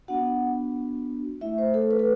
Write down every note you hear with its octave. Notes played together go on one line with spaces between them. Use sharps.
B3 D4 F#4 F#5
A3 E4 E5
C5
A4
B4
A4